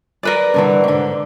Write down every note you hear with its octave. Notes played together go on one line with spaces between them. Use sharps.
A#4 B4 D5
G2 D3 E3
G#2 D3